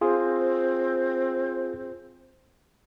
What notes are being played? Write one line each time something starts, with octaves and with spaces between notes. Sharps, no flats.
C4 F4 G#4